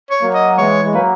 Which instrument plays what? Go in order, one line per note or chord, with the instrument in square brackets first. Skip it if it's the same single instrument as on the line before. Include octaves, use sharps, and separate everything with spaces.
[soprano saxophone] C#5
[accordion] F#3 A#3
[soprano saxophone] D#5
[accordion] E3 G#3 [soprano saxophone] C#5
[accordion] G#3
[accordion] F#3 A#3 [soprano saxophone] B4